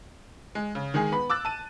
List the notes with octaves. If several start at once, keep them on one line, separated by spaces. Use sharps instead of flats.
G#3
C#3
D#3 G#3 D#4 G#4
B3 B5
D6 E6 F#6 A6
A5 D#7